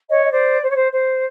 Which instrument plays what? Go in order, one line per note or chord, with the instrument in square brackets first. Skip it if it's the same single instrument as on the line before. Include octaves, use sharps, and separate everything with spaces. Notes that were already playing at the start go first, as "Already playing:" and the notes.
[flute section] C#5 D#5
D#5
C5 D5
C5
C#5
C5
C5